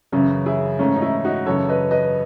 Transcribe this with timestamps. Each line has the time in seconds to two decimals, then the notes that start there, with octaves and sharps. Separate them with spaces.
0.12 F#2 C#3 E3 C#4 E4
0.46 E4 G#4
0.79 G#2 E3 A3 C#4
0.96 D#4
1.02 C#4 E4
1.24 D#4 F#4
1.46 F#2 C#3 E3 A4 C#5
1.69 B4 D#5
1.91 B4 D#5